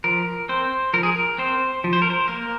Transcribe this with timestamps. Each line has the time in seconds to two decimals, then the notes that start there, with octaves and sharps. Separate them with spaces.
0.04 F3 A#4
0.49 C4 C5
0.94 F3 A#4
1.03 G#4
1.12 A#4
1.38 C4 C5
1.84 F3
1.93 C5
2.02 A#4
2.10 C5
2.28 A#3 A#4